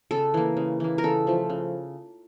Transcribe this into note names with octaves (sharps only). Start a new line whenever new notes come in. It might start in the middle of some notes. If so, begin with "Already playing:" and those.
C#3 A4
E3 A#3
C#3
E3 A#3
A#4
C#3 A4
F3 A3
C#3